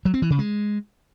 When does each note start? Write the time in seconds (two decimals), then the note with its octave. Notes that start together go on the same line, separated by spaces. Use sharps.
0.05 F#3
0.14 C4
0.22 E3
0.30 C#3
0.39 G#3